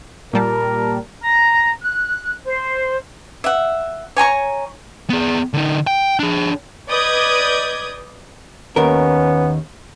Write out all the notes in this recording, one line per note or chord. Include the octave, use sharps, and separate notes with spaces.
A#2 G3 A#4 A5
A#5
F#6
C5
E5 F#5
C#5 G#5 A#5 C#6
B3 G#4
D3 D#4
G5
D4 G#4
B4 D5 D#5 D#6 G6 G#6
D#2 B3 C#4 A#4